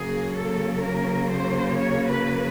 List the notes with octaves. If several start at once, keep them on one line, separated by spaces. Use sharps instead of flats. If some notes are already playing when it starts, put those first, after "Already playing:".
Already playing: C#3 F#3 A#3 G#4
A4
A#4
C5
C#5
B4